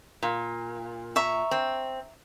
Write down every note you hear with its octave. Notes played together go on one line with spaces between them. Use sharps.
A#2
E5 A#5 C#6
C4